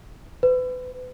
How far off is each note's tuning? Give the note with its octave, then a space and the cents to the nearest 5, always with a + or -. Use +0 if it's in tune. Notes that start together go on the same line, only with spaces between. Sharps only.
B4 +35